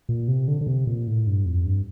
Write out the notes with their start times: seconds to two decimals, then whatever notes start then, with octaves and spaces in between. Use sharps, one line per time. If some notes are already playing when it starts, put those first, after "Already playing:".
0.09 A#2
0.28 C3
0.48 D3
0.61 D3
0.67 C3
0.87 A#2
1.07 A2
1.27 G2
1.46 F2
1.66 G2